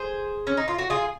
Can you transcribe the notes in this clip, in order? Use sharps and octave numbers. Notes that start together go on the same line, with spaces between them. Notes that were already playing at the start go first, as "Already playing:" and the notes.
Already playing: G#4 C5
C#4
D#4
F4
F#4
F4 G#4